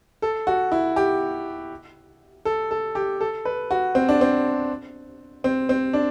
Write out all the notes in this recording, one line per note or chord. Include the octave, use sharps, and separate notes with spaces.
A4
F#4
E4
G4
A4
A4
G4
A4
B4
F#4
C4
D4
C4
C4
C4
D4